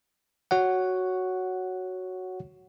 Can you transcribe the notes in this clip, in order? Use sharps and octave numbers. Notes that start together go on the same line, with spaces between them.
F#4 C#5 F#5